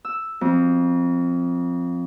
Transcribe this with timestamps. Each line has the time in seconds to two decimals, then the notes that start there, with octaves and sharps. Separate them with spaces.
0.05 E6
0.41 F2